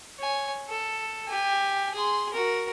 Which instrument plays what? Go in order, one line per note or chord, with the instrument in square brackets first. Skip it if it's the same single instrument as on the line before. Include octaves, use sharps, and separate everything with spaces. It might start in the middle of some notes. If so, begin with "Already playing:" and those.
[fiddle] C#5 G#5
A4
G4 G#5
G#4 C6
F#4 A#4